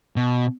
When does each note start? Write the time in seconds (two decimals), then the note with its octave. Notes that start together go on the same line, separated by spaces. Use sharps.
0.16 B2